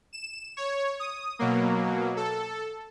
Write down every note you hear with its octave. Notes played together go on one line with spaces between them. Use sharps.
E7
C#5
D#6
B2 F#3 A#3
A4